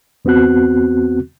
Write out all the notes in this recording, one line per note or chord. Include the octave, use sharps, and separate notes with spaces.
E2 B3 C4 F#4 F#6